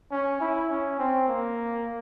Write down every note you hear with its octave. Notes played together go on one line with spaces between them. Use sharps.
C#4
E4
C#4
C4
A#3